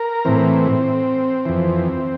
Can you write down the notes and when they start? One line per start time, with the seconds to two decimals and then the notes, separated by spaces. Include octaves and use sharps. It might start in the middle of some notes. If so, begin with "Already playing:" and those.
Already playing: A#4
0.25 A2 E3 C4
1.46 F2 E3